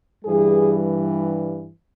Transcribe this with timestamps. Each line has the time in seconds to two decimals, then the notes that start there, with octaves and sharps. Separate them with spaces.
0.24 G2 E3 G3 G#4